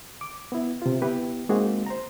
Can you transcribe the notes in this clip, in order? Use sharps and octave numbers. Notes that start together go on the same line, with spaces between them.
D6
B3 E4
C3 F4
B3 E4 G4 B4
G#3 A#3 C4 D#4 F#4 G#4
C5 A#5